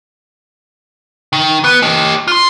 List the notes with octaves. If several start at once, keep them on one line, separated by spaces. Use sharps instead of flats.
D#3
B3
G4 D#5
F4 C6